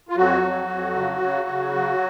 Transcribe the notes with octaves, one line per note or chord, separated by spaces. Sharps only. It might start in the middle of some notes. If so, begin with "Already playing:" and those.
F4
F2 F#3 F#4
F2
F2
C#3
C#3
C#3
F#3